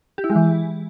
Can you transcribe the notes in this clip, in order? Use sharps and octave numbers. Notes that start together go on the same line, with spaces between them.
G4
E4
G#3
E3